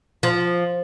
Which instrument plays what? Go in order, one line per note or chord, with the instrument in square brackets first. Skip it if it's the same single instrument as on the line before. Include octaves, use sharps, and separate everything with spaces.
[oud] F3